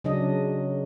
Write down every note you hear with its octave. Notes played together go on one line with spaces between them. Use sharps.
C#3 F#3 D4 D#5